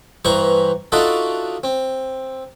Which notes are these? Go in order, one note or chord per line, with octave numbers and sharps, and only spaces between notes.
G2 E3 C5 A#5 C#6
D4 D#4 F4 F#4 A4 E5
C4